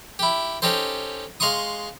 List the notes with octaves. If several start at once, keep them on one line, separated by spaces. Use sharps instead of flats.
E4 G4
C#4 D#4 G4 A4 C5
G#3 F5 C6 C#6 D#6